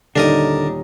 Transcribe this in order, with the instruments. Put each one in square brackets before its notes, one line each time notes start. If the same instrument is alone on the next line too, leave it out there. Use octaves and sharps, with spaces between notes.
[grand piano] D#1 D#4 [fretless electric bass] D3 [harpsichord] D4 A#4 D#6